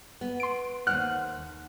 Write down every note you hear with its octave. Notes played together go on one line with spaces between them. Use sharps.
B3
C6 D7
D#2 C5 F#5 F6 F#6